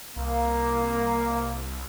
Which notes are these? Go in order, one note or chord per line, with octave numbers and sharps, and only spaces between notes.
C2 A#3